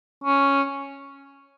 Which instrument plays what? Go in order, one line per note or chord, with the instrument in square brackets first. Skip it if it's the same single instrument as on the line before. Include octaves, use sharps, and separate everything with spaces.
[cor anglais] C#4